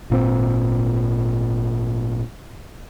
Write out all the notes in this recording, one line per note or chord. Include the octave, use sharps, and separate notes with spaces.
G#1 A#2 C4